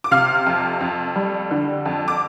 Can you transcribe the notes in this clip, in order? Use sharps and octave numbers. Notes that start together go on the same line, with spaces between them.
D6
C3 F5 F6
F2
F2
G3
D3
F2
D6